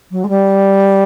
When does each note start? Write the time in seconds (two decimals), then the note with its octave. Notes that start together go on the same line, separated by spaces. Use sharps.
0.11 F#3
0.24 G#3
0.29 G3